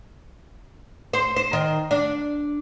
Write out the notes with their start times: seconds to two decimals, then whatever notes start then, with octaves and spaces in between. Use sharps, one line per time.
1.13 C5
1.36 C5
1.53 D#3
1.91 D4